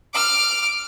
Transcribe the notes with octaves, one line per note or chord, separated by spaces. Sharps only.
D6 F6